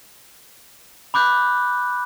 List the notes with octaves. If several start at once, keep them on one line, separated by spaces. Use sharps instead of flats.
B5 D6 F#6 G6